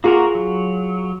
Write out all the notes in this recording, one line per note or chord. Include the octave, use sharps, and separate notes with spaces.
A#3 F4 F#4 G#4 A#4
F#3